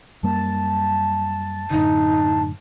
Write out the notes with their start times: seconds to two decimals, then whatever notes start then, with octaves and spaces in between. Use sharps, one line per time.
0.23 F#2 G3 A#3 A5
1.71 F#2 A2 D3 D#4